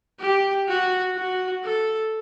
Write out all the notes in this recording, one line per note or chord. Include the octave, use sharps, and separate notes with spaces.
G4
F#4
F#4
A4